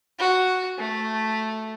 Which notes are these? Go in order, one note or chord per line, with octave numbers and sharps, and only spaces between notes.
F#4
A3